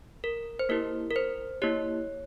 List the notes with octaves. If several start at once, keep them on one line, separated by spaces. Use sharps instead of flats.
A#4
C5
A#3 E4 G4 A#4
A#4
C5
A#3 E4 G4 C#5